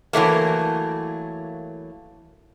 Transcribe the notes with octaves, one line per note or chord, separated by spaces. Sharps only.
E3 F#3 A3 A#3